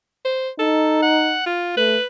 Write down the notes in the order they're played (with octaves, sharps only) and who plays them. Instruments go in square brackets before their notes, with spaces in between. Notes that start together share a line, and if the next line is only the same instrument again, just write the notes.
[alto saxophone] C5
[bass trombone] D#4 [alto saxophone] A4
[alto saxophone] F#5
F4
[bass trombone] A3 [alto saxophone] B4